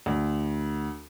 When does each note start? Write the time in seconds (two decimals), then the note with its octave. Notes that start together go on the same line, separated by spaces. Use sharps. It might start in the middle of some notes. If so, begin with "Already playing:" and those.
0.06 D2